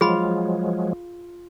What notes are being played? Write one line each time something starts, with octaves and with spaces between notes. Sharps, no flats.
F3 F#3 G#3 F4 G#4 B5